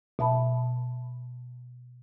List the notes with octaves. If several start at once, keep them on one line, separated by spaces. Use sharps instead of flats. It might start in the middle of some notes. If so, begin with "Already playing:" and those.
B2 E5 A5 B5